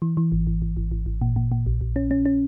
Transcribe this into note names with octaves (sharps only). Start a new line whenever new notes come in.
E3
E3
G#1
G#1
G#1
G#1
G#1
G#1
A#2
A#2
A#2
A#1
A#1
C#4
C#4
C#4